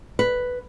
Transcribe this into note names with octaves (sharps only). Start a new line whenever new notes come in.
B4